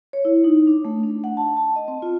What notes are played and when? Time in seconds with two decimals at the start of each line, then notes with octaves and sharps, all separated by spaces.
0.13 C#5
0.25 E4
0.44 D#4
0.67 D4
0.85 A3
1.03 D4
1.24 F#5
1.37 A5
1.57 A5
1.76 D#5
1.88 C4
2.02 F4